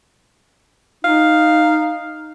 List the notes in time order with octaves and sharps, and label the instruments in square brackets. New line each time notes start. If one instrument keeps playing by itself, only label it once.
[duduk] D#4 [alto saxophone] F5